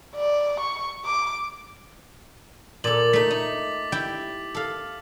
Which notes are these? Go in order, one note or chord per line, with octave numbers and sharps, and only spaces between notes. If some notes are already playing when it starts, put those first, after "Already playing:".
D5
C#6
D6
A#2 A4 D6 A6 F#7
A3 D#4 B6 F#7
D#4
E4 G4 G5
A4 F5